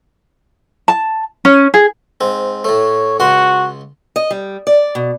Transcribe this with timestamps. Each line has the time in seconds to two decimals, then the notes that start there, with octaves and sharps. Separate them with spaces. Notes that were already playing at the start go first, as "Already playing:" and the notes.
0.88 A5
1.45 C#4
1.74 G#4
2.21 G#2 C4
2.64 A2 A3 C#5
3.20 C#2 F#4 F#5 C6
4.16 D#5
4.31 G3
4.67 D5
4.95 B2